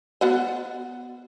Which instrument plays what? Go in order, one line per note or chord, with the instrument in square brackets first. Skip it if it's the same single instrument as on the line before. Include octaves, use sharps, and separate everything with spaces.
[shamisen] B3 F#4 D#5